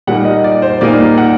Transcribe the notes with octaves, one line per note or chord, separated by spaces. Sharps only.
A#2 G3 A#3 D#4 F#5
D#5
D5
C5
A#2 G3 A#3 D#4 D5
F#5